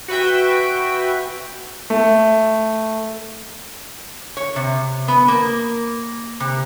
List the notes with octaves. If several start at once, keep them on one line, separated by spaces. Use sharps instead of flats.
F#4 B4 E5 G5
A3
C#5
C3
B3
A#3
C3